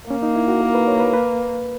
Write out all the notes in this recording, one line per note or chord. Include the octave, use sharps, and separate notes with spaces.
A#3 C#4
D#4
E4
F#4
A#4
B4
C#5
B4
B4